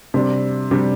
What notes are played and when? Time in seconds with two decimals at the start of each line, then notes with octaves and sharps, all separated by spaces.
0.14 C3 G3 D4
0.71 C3 G3 D4